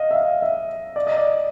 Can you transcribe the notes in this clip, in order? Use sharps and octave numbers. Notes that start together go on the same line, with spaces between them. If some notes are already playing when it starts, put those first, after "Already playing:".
Already playing: D#5 F5
E5
F5
E5
D5
D#5
D5